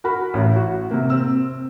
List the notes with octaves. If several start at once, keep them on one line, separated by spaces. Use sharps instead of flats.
F#4 A#4 B5
A1
F#4
C3 A#3
C4 E6